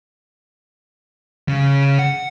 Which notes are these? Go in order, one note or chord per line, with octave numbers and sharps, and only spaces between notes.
C#3
F#5